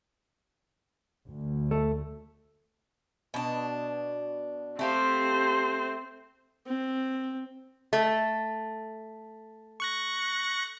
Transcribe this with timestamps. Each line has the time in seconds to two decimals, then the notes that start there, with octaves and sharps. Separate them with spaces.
1.28 D2
1.71 A3
3.34 B2 D4
4.79 A3 C4 G4 C5 F5
6.67 C4
7.93 A3
9.80 C#6 F#6 A#6